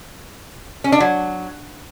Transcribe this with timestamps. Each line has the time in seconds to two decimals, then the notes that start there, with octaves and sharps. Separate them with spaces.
0.84 C#4
0.92 D4
1.00 F#3